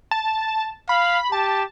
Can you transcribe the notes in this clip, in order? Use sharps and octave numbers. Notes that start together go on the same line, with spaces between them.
A5
F5 B5
G4 A5